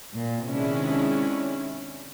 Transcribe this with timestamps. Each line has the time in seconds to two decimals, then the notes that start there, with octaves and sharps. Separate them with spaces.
0.14 A#2
0.47 C3 D#3 G#3 C#4 D4 E4